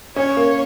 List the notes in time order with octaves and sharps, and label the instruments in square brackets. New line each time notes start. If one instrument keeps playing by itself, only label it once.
[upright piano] C#4 [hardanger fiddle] C#5
[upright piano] A#3